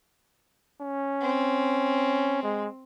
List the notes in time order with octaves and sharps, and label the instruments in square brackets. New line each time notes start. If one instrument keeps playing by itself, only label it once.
[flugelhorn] C#4
[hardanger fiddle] C4
[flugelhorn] G#3